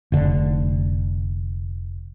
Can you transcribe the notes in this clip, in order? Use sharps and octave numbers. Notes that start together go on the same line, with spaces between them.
F1 D3